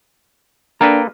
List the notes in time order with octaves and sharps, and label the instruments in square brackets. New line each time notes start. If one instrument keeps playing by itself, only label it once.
[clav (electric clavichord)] A#3 A4 B4 [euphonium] D4 [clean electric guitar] G5 A#5